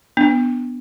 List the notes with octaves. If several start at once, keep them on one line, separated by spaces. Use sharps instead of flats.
B3 D4